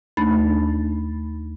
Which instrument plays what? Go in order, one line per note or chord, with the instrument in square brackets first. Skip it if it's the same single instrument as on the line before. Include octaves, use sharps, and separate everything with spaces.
[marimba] D#2 A3 D4 D#4 B5 A6